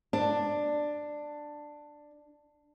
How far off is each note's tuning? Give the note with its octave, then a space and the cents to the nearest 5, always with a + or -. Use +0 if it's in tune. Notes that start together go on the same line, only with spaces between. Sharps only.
D4 +10